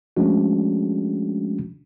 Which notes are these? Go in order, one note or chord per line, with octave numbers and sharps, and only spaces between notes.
F3 G#3 A3 C#4 D4 F#4